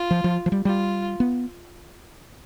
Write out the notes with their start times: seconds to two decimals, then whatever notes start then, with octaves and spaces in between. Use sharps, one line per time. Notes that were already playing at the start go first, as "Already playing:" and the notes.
Already playing: F4
0.11 F3
0.24 F3
0.46 F3
0.52 G3
0.65 G3 F4
1.20 B3